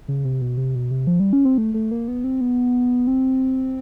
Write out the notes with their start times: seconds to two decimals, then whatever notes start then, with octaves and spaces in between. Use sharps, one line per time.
0.08 C#3
0.25 C3
0.41 B2
0.57 C3
0.75 B2
0.91 C3
1.07 F3
1.20 G3
1.33 C#4
1.45 C4
1.58 A3
1.74 A3
1.91 A#3
2.08 B3
2.24 C4
2.41 B3
3.07 C4